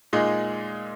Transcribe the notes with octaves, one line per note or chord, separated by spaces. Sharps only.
A#2 G#3 D#4 G#4